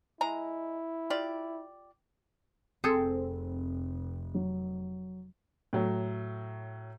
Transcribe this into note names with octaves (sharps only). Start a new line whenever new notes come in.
G#3 E4 A#5
F4 G4 D5
F1 C4 G#4 A4
F#3
A2 F#3